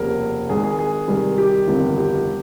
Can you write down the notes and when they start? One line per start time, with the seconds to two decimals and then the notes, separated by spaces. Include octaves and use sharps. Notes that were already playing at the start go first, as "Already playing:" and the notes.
Already playing: F1 D#2 C#3 A#4
0.49 G#1 G#2 D#3 G#4
0.64 G#4
0.79 G#4
1.08 C2 C3 D#3
1.38 G4
1.68 G1 F2 C3 D#3
1.98 G4